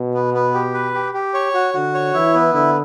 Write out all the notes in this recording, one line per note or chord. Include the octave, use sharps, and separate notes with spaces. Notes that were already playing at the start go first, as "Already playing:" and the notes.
Already playing: B2
B3
B3
G4
B4
G4
G4
C#5
F#4
D3 F#4
C#5
E3 E4
B3
D3 E4